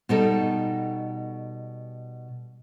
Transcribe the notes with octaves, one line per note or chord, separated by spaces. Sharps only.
B2 G3 D#4 A4